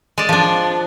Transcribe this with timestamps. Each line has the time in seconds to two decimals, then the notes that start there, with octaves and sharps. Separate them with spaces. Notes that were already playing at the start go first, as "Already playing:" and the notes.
0.18 G#3 D5
0.29 F3 D4